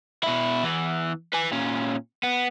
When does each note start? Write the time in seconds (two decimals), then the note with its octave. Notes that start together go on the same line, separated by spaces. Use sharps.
0.23 B2 E4
0.63 E2 E3
1.34 B4 G#5
1.52 A#2 C#4
2.23 B3